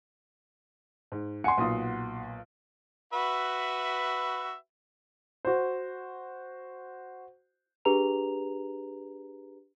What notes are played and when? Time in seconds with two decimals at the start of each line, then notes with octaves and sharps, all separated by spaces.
1.12 G#2
1.44 F#5 G#5 C6 C#7
1.58 B1 A#2 D#6
3.13 F#4 B4 E5
5.45 F#4 C5
7.85 D4 G4 G#4 B4 A#5 F7